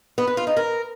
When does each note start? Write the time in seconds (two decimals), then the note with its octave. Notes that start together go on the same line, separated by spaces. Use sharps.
0.18 B3
0.27 B4
0.37 F4
0.47 D#4
0.57 A#4